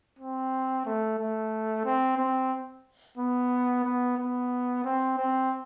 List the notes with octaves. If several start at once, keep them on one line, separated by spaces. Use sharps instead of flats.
C4
A3
A3
C4
C4
B3
B3
B3
C4
C4